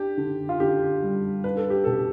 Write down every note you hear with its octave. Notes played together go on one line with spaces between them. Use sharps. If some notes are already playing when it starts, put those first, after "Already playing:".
Already playing: D4 G4
D3
F4
D3 G4
G3
D4 B4
A4
G4
B2 A4